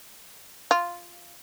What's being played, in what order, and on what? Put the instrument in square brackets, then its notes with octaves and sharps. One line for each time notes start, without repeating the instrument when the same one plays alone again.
[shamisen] F4